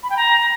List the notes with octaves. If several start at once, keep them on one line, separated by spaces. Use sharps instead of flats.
B5
G5
A#5